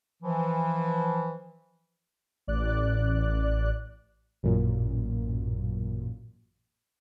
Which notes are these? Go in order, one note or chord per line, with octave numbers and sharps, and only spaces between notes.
E3 F3
A1 D5 F#6
A1 F#2 A#2